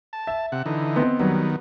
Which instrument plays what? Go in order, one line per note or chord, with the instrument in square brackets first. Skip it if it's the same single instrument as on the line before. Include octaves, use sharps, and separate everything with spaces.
[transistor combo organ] A5
[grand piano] E5
[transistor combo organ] C3 F#5
D3 E3 D#4
[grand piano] B3 C4 D#5
[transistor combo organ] D#3 B3 [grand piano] F#3 G3